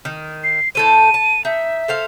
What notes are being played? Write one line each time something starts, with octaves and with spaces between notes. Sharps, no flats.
D#3
C7
A2 A4 C5 D#7
A5
D#4 E5
A4 C5 F5